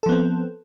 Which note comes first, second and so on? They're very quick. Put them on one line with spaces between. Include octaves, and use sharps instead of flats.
A4 F3 B3 C4